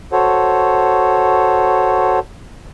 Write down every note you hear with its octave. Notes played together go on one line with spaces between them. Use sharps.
F#4 A4 C5 C#5